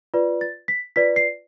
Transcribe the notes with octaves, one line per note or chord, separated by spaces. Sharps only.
F4 B4 D5
A6
B6
F4 B4 D5 B6
C7